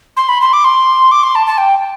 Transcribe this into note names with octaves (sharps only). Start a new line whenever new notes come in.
C6
B5
C6
D6
C6
D6
C6
A5
A5
G5